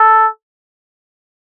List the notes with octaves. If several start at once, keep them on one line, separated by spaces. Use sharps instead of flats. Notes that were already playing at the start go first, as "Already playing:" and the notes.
Already playing: A4